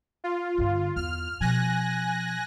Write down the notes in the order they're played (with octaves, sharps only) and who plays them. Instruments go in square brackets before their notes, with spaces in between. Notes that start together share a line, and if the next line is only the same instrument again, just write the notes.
[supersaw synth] F4
[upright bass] G2 D3
[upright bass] E2 [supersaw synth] F6
[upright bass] B2 F3 [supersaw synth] G#5 F#6 A#6